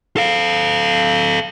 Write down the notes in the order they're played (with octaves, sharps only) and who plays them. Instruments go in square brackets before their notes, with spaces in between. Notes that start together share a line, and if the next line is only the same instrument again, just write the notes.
[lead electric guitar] A4 F5